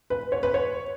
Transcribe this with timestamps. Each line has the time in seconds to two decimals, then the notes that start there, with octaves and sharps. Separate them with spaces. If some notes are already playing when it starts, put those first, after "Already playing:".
0.10 B4
0.32 C#5
0.43 B4
0.54 C#5